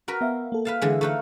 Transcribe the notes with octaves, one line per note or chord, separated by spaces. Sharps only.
F#4 A#4 B4
B3 E5 F5
A#3 A4
B4 F5 A5
D3 E3 G#3
A3 D#4 F5 C#6 F#6